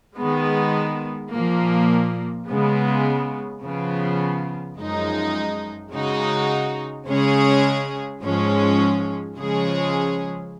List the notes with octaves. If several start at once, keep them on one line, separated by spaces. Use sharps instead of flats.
D#3 G#3 B3
A#2 F3 A#3
C#3 G#3 B3
C#3 F3 B3
F#2 F3 G#3 D#4
C#3 G#3 D#4 F#4
C#3 G#3 C#4 G#4
G#2 F3 G#3 C#4
C#3 F3 G#3 C#4 G#4